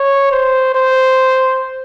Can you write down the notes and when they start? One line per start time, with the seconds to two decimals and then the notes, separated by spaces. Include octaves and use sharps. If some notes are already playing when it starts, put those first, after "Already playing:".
Already playing: C#5
0.31 C5
0.75 C5